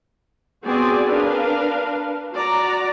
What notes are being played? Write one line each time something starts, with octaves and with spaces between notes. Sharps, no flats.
B3 C4 F#4 G#4 D5 G#5
D4 A#4 B4 F5
F#4 D5 A#5